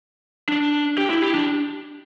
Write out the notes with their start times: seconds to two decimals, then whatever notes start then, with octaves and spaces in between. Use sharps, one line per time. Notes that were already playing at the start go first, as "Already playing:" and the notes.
0.49 D4
0.98 G4
1.10 E4
1.22 G4
1.34 D4